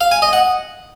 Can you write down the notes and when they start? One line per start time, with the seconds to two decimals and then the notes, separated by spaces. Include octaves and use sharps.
0.01 F5
0.11 G#5
0.22 D#5
0.33 F#5